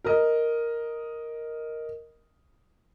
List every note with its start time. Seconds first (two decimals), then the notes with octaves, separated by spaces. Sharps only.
0.04 A#4 D#5